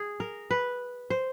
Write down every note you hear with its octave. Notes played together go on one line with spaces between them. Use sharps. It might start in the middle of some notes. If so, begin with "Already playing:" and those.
Already playing: G#4
A#4
B4
C5